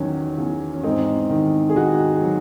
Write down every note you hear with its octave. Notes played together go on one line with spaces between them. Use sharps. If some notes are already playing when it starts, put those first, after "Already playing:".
Already playing: E2 D#3 F#3 C#4
E2
C#4
G#2 C4 D#4
D#3
G#4
D#3 D#4 F#4
F#3